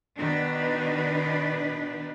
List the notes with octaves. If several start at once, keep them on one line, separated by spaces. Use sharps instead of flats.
B2 D#3 D4 D#4 B4